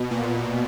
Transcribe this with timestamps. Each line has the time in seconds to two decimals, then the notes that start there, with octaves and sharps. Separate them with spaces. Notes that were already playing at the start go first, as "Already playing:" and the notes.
Already playing: B2
0.11 A#2